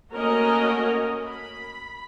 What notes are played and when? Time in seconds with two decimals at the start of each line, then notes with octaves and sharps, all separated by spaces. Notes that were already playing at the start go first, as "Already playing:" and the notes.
0.11 A3 A#3 C#4 F#4 A#4 D#5
1.23 B5